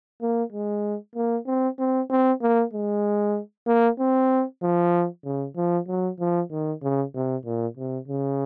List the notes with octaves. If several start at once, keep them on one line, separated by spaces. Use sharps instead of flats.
A#3
G#3
A#3
C4
C4
C4
A#3
G#3
A#3
C4
F3
C#3
F3
F#3
F3
D#3
C#3
C3
A#2
C3
C#3